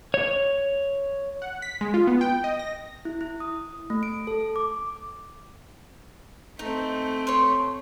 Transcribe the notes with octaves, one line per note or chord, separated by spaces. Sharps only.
C#5
F#5
B6
G#3
F4
B3
G5
D#5
A#6
E4
E4
D#6
A3
D7
A4
D6
A3 C4 D#4
C#5 C6